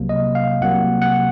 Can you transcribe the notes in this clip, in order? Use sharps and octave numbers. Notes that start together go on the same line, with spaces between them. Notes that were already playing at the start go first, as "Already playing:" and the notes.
Already playing: C2 C3 F#3 A#3
D#5
F5
C2 C3 F#3 A#3 F#5
F#5